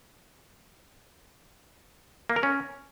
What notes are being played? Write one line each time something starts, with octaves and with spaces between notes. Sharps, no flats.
A#3
A#4
C#4